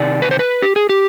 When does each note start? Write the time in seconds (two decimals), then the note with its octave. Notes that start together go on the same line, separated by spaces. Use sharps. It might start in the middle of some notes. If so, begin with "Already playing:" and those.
Already playing: C3 D#3 D5
0.22 B4
0.31 C5
0.39 B4
0.62 G4
0.76 G#4
0.89 G4